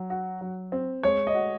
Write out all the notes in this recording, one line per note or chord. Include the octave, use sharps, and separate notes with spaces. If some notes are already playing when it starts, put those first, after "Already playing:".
Already playing: F#3
F#4
F#3
C4
G#3 C#5
D#5
F#4